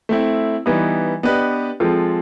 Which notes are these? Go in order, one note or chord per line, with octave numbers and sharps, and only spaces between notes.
A3 C4 E4
E3 G3 B3 D#4
B3 D4 G4 B4 D#5
F3 G#3 C4 F4 A4